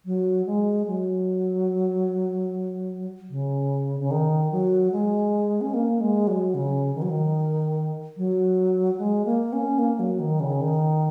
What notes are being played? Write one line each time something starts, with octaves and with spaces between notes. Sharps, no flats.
F#3
G#3
F#3
C#3
C#3
D#3
F#3
G#3
C#4
A#3
G#3
F#3
C#3
D#3
F#3
D#3
F#3
G#3
A#3
C#4
A#3
F#3
D#3
C#3
D#3